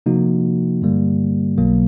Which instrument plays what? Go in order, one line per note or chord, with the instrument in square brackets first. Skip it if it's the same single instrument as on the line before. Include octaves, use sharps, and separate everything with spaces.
[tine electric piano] C3 F3 A#3 D#4 F#4
G2 D3 G3 A#3
B1 B2 F#3 A#3